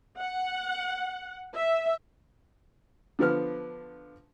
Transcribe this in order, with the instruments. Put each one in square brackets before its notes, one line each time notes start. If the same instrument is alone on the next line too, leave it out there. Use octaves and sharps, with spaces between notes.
[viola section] F#5
E5
[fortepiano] D3 F3 B3 F6